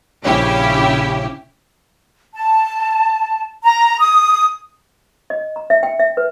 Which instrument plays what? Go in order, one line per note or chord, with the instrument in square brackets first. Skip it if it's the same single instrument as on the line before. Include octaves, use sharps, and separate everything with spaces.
[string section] A#1 C#3 C#4 E4 G4
[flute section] A5
A#5
D#6
[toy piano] D#5
A#5
E5
G5
E5
B4